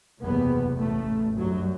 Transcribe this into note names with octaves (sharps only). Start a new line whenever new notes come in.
F#1 E2 C3 B3
A1 A2 A3
G1 F#2 F#3